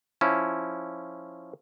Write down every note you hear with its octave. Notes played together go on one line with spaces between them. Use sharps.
F3 C#4 E4